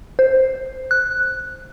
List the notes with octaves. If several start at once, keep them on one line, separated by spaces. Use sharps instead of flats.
C5
F#6